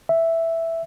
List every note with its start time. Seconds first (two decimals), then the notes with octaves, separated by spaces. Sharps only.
0.09 E5